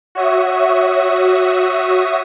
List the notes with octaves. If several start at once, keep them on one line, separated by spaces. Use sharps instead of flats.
F#4 C#5 E5 D#6